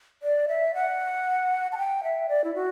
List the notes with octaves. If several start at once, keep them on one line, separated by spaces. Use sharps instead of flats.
D5
E5
F#5
A5
G5
E5
D5
E4
F#4